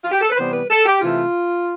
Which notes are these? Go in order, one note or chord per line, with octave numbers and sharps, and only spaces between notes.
F4
G4
A4
B4
C3 E3 G3 B3 C5
B4
A4
G4
C3 E3 A3 F4